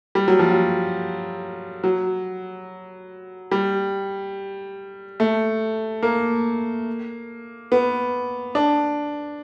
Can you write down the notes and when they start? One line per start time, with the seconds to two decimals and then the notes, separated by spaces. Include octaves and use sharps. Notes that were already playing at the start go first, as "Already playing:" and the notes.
0.15 G3
0.28 F#3
0.39 F3
0.50 F#3
1.83 F#3
3.51 G3
5.20 A3
6.03 A#3
7.72 B3
8.55 D4